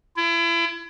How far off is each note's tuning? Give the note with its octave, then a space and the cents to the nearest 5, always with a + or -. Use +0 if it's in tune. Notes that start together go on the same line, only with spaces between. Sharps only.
E4 +35